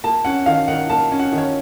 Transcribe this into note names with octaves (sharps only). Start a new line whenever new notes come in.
A#3 A5
C#4 F#5
D#3 F5
D#3 F#5
A#3 A5
C#4
F#5
D#3
C#5